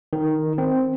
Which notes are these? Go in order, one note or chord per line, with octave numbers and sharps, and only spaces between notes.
D#3
C4